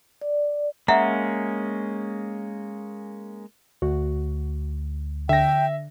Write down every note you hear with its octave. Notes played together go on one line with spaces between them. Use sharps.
D5
G#3 A#3 C#4 E5 F#5 A#5
D2 F#4
D3 E5 G5 A#6